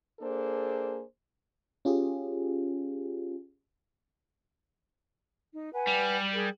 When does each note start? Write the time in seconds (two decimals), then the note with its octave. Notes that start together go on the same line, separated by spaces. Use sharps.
0.20 A#3 D4 G#4 A4 C5
1.85 C#4 F4 G4 G#4
5.55 D#4
5.72 B4 F#5 G#5
5.87 G3
6.33 G#4 A#4 G5